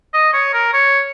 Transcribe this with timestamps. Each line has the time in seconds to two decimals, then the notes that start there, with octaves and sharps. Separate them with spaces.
0.14 D#5
0.33 C#5
0.54 A#4
0.73 C#5